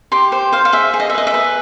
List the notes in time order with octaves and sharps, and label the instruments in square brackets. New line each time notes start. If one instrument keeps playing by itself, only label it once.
[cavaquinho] G4 C6
C5
C5 F5
F5
G#4 E5
G#4
D#5
E5
B4 D#5
E5
B4